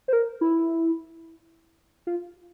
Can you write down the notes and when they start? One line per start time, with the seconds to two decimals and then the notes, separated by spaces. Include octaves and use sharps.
0.08 C5
0.13 A#4
0.41 E4
2.07 F4